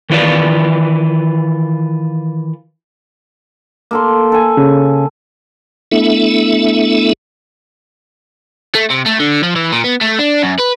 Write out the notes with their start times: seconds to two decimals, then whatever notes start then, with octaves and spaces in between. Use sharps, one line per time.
0.10 D#3 E3 F4 B4 D5
3.91 A#3 A4 C6
4.32 A4 G#5
4.57 C#3
5.92 A3 B3 D4 E4 A4 E5
8.75 A3
8.90 C3
9.06 A3
9.20 D3
9.43 F3
9.56 E3
9.72 A#2
9.84 B3
10.01 A3
10.19 D4
10.42 F#2
10.58 B4